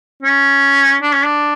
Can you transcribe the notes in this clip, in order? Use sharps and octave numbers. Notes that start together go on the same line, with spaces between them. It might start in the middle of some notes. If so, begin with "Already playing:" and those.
C#4
D4
C#4
D4